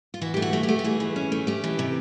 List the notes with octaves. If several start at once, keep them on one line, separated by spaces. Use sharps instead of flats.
F4
E3 F#4
A3 G4
F#4
A3
G4
A3
G4
E3 G#4
E3
C#4
A3
A3 G4
E3
C3